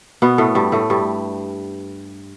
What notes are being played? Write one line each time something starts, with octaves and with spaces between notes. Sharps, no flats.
B2 B3
A2 A3
G2 G3
A2 A3
G2 G3